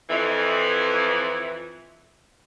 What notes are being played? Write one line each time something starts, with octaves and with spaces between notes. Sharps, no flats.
F2 E3